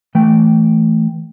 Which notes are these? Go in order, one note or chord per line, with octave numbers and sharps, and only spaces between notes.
E3 A3 G5